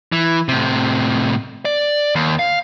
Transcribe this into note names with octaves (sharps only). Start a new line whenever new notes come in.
E3
A2 C3
D5
D#2
F5